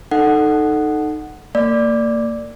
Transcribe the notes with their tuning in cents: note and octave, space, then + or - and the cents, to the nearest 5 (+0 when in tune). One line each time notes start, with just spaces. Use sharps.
D#4 -15 A4 +0 F#5 +0
A#3 -30 D5 +0